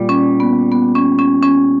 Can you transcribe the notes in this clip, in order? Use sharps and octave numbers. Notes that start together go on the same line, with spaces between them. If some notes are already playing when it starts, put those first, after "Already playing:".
Already playing: A#2 G3
C#4
B3
B3
C#4
C#4
C#4